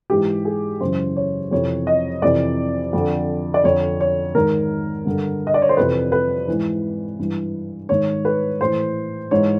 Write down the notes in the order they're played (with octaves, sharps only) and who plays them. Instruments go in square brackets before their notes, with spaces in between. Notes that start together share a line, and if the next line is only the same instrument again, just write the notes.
[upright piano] G#2 E3 G4
G#4
F#2 C#3 E3 C5
C#5
F2 C3 E3 C#5
D#5
F2 C3 E3 D5
F2 D3
D5
F2 D3 C#5
C#5
G#2 D#3 A#4
G2 D3
D#5
D5
C#5
C5
F2 C3 E3 B4
B4
G#2 E3
G2 E3
G#2 D#3 C#5
B4
A2 E3 C5
G#2 E3 C#5